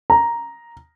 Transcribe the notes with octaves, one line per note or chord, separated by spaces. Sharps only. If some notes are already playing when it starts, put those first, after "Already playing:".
A#5